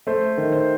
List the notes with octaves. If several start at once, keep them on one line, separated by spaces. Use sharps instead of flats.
A3 C5
D#3
C5